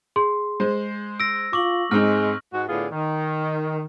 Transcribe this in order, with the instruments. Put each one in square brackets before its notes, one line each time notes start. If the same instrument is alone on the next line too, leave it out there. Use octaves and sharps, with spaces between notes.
[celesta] G#4 C6
[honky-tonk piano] G#3 C5
[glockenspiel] E6 A#6 [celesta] D7
[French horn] F4 [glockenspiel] C#6 F#7 [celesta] D6
[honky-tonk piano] G#2 C4 D#4 [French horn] G#3 [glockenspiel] F6
[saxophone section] G#2 G#3 F#4
A2 D3 B3 F4 G#4
D#3